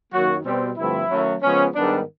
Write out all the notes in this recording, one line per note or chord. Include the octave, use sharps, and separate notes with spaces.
F#2 D#3 F#3 A#3 F#4
B2 G3 C4
G2 D3 F3 A3 C4 E4
D#3 F#3 A3 C#4
C#3 F3 G#3 B3 C#4
G#2 D#3 G3 B3 D4